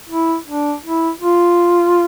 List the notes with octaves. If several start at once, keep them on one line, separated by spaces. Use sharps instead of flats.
E4
D4
E4
F4